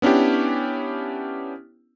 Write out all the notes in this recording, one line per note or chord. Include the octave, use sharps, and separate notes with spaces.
B3 C#4 D4 E4 G4